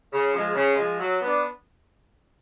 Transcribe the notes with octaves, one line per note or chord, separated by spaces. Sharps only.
C#3
F3 G#3
C#3
F3 G#3
F#3
B3 D4